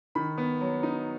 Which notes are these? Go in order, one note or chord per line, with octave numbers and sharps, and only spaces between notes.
D#3 B5
B3
F#3
D#4